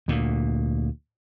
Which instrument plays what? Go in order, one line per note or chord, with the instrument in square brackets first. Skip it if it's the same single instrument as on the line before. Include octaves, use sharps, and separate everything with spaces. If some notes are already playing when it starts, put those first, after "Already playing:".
[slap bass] D2 A#2